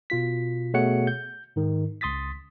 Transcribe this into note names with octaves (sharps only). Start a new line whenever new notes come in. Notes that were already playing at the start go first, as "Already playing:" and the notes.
B2 F4 B6
B2 A3 G#4 C#5 F#5 C#7
G6
G#2 D#3
C#2 C6 D#6 A6 B6